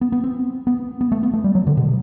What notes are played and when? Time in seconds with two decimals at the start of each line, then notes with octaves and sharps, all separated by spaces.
0.01 B3
0.12 B3
0.24 C4
0.67 B3
1.01 B3
1.12 A3
1.23 B3
1.34 A3
1.44 G3
1.55 F#3
1.67 D3
1.77 B2